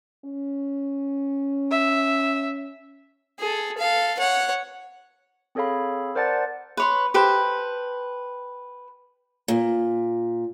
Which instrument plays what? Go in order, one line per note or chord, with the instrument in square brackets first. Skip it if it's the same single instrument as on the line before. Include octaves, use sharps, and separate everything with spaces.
[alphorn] C#4
[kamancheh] E5
[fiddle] G#4 A4
A4 F5
C#5 F#5
[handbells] C4 G#4 A4 C#5 F5 B5
A#4 C5 D5 F#5 A5 A6
[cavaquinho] B4 C#5 C6
G4 A4 B4 C5
[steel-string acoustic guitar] A#2